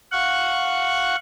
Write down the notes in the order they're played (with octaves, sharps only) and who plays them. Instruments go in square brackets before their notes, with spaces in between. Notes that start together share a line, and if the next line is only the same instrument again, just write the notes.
[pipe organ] F5 F#5 C#6 F#6